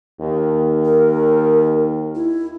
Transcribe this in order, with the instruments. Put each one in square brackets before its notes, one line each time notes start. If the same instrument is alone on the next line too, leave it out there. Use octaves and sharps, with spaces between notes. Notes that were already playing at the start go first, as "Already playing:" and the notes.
[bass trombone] D#2
[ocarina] A#4
E4